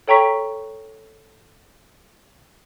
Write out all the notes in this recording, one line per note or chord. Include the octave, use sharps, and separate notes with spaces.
A4 C#5 G5 A#5 C#6 B6